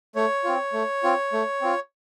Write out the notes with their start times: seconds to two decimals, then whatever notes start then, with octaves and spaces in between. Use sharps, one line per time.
0.16 A3 C#5
0.44 C4 F4
0.73 A3
1.03 C4 F4
1.33 A3
1.61 C4 F4